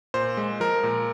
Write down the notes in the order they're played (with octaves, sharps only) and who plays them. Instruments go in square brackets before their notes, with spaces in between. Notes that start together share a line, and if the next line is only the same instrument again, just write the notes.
[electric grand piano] A#2 C5
G#3
F3 A#4
A#2